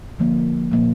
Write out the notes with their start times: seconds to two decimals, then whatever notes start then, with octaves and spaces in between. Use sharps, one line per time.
0.18 D3 F3 A#3
0.72 A#2 F3 A#3